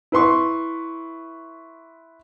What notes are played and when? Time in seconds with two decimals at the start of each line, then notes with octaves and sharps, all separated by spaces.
0.12 E4 B4 C6 C#6